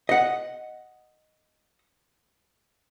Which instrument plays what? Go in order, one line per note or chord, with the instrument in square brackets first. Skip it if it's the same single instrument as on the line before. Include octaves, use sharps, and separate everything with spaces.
[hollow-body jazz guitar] D#5 F#5